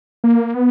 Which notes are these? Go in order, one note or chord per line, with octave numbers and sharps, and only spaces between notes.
A#3
B3